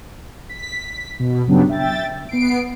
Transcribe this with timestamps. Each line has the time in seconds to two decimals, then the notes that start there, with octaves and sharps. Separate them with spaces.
0.49 B6
1.19 B2
1.47 G2 C#3 F#3 G3 B3 D4
1.69 E5 G5 A6
2.29 B3 C7 D7